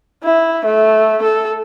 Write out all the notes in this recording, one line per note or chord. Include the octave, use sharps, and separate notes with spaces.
E4
A3
A4